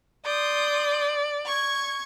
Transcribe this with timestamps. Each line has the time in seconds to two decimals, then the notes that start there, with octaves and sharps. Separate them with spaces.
0.25 D5 C6 D#6 G6
1.45 C#6 G#6